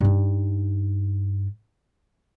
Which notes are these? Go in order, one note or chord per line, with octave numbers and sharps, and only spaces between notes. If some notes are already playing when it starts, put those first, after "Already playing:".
G2 D#4